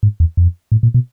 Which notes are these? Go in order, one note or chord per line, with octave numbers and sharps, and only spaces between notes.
G#2
E2
F2
A2
A#2
B2